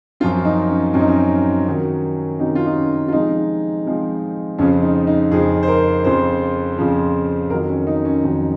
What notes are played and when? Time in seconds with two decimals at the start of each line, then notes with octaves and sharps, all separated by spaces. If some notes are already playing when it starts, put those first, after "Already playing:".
0.20 F#2 F3 C4 F4
0.45 D#4
0.69 C#4
0.93 F#2 F3 C4 C#4
1.00 D#4
1.08 C#4
1.66 C3 D#3 F#3 C#4
2.39 C3 D#3 F#3 C#4 D#4
2.55 F4
2.66 D#4
2.76 C#4
3.08 F4
3.12 C3 F3 G#3 C4 D#4
3.86 C3 F3 G#3 C4
4.58 F2 C#3 F3 C4 C#4
4.82 D#4
5.07 D#4
5.31 F2 C#3 F3 C4 G#4
5.63 C5
5.68 A#4
6.04 F2 C#3 F3 C5
6.78 F2 C#3 F3
7.50 F2 D#3 F#3 A#4
7.69 C#4
7.87 D#4
8.05 C#4
8.24 F2 D#3 F#3